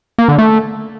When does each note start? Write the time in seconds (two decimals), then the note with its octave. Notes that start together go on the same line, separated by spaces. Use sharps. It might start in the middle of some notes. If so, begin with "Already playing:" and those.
0.18 A#3
0.28 D3
0.38 A3